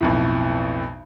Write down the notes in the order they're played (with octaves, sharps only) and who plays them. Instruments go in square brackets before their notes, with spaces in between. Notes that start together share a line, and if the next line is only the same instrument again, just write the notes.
[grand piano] B1 F2 A2